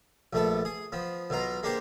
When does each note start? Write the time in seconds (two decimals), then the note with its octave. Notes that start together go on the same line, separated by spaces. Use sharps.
0.33 A#1 A3 B3 A4
0.65 G#4
0.92 F3 B3
1.30 B1 B2 F4 A#5
1.63 G#3 A#3 D4 G4 C5